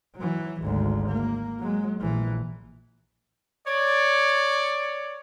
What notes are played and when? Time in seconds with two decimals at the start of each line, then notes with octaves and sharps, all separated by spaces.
0.16 E3 F#3
0.62 G#1 D2
1.09 A#3
1.60 F#3 G#3
2.01 A#1 E3
3.67 C#5 D5